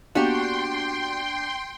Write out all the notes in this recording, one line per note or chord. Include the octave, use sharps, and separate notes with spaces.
A#3 B3 D4 F#4 G4 F5 G5 C6